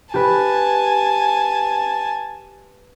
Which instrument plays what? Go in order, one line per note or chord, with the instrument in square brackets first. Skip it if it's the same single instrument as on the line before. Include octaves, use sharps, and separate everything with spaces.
[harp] G4 B4 [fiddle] G#5 A5